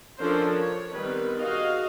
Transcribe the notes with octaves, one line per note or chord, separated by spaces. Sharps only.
F3 C#4 D4 A4 A#4 C5
C#5
D#3 G3 B3 C4 B4
F#4 G#4 D#5 F5